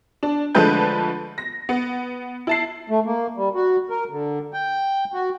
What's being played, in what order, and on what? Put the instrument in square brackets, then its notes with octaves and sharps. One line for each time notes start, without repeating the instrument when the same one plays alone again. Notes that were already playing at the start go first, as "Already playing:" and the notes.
[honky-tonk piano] D4
D3 F3 G#3 A3 B4 G6
A#6
B3
E4 A5 C7
[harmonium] A3
A#3
G3
F#4
A#4
D3
G5
F#4